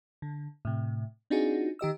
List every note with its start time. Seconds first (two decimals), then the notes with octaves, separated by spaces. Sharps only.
0.22 D3
0.65 A2 C3
1.30 C4 D4 D#4 F4 F#4 G#4
1.79 D#3 G4 D#5 E6